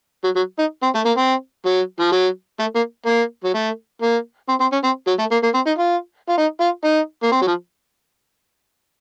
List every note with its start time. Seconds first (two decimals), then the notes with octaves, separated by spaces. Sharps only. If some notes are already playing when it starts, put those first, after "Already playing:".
0.24 F#3
0.36 F#3
0.59 D#4
0.83 C4
0.95 A3
1.06 A#3
1.18 C4
1.66 F#3
2.00 F3
2.12 F#3
2.59 A3
2.75 A#3
3.06 A#3
3.44 F#3
3.54 A3
4.02 A#3
4.49 C4
4.60 C4
4.72 C#4
4.84 C4
5.07 F#3
5.19 A3
5.31 A#3
5.43 A#3
5.54 C4
5.67 D#4
5.78 F4
6.29 F4
6.38 D#4
6.60 F4
6.84 D#4
7.23 A#3
7.32 C4
7.42 F#3
7.47 F3